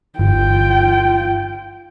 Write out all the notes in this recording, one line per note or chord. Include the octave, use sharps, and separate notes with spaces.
G1 F4 G5